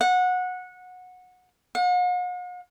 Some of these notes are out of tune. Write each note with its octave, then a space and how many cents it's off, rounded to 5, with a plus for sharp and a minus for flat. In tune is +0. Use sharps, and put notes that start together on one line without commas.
F#5 -20
F#5 -45